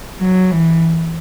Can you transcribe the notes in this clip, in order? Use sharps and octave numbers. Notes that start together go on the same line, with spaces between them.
F#3
E3